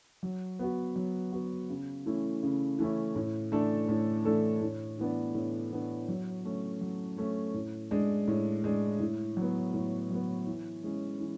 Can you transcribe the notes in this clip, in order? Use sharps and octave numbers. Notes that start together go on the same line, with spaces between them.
F#3
B3 F#4
F#3
B3 F#4
C#3
E3 A3 C#4 E4
C#3
E3 A3 C#4 E4
A2
E3 A3 D4 A4
A2
E3 A3 D4 A4
A2
E3 B3 D4
A2
E3 B3 D4
F#3
A3 C#4
F#3
A3 C#4
A2
G#3 D4
A2
G#3 D4
A2
F#3 B3
A2
F#3 B3
E3
G#3 C#4 E4
E3